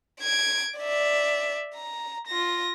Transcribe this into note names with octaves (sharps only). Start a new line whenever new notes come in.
G#6 D7
D5 E5
A#5
F4 A#6